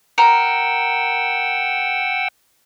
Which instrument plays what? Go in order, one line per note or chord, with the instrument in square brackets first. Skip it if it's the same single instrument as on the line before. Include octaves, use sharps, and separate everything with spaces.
[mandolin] A#4 [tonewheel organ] F#5 G5 E6